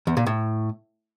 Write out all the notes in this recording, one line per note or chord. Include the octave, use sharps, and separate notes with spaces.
E2
A#2
A2